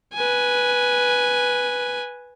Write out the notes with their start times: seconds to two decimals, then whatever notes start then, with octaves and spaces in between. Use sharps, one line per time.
0.14 B4 G#5